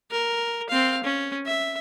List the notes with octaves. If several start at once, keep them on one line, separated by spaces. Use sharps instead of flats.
A#4
C4 F5
C#4
E5